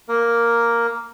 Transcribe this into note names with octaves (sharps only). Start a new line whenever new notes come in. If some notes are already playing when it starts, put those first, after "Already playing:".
A#3 A#4